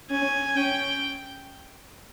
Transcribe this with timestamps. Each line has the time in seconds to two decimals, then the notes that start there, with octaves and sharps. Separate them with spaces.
0.11 C#4 G#5
0.56 C#4 G5